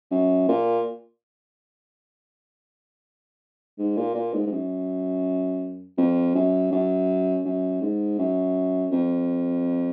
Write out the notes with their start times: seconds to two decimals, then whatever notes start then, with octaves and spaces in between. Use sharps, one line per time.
0.11 F#2
0.48 A#2
3.78 G#2
3.97 A#2
4.15 A#2
4.33 G#2
4.47 G#2
4.52 F#2
5.98 F2
6.35 F#2
6.72 F#2
7.45 F#2
7.81 G#2
8.19 F#2
8.91 F2